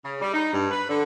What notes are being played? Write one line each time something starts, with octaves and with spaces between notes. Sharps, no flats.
C#3
G3
D#4
G2
B4
D3